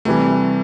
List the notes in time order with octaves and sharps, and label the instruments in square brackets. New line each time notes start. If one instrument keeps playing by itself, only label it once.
[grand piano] C3 E3 G3 [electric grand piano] A3